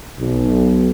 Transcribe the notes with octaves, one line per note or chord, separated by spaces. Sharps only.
B1